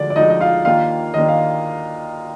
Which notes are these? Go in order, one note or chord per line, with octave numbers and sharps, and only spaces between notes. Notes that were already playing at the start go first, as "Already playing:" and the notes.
Already playing: D2 D3 F3 G#3 D5
D5
D2 D3 F3 G#3 D#4 D#5
D#5
F4 F5
D#2 D#3 A#3 D4 F4 F5
D#2 D#3 A#3 D4 D#5
F5